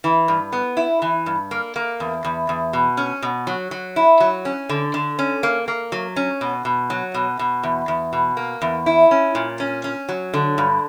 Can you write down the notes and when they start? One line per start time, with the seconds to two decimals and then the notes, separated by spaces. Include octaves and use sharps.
0.04 E3
0.28 G2
0.53 B3
0.77 E4
1.02 E3
1.26 G2
1.51 A#3
1.76 A#3
2.00 E2
2.24 E2
2.49 E2
2.73 B2
2.97 C#4
3.22 B2
3.47 F#3
3.71 F#3
3.96 E4
4.20 F#3
4.45 C#4
4.69 D3
4.94 D3
5.19 C#4
5.43 A#3
5.68 A#3
5.92 F#3
6.16 C#4
6.41 B2
6.65 B2
6.90 F#3
7.14 B2
7.39 B2
7.63 E2
7.88 E2
8.13 B2
8.37 A#3
8.62 E2
8.86 E4
9.11 C#4
9.35 A#2
9.60 C#4
9.84 C#4
10.09 F#3
10.33 D3
10.58 G2